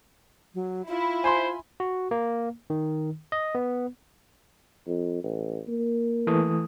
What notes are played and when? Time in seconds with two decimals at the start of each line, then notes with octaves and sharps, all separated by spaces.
0.54 F#3
0.88 E4 F4
1.24 C5 G#5 B5 C6
1.80 F#4
2.11 A#3
2.70 D#3
3.32 D#5
3.55 B3
4.87 F2
5.23 A1
5.68 A#3
6.27 E3 A3 D#6